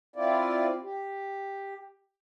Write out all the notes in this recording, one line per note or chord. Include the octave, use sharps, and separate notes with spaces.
C4 E4 F4 D5
G4